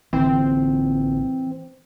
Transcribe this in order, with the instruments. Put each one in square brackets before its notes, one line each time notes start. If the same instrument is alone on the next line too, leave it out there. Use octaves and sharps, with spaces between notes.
[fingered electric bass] A1 D3 [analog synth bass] E3 [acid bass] C4